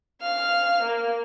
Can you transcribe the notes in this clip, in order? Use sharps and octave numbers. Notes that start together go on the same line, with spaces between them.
F5 F6
A#3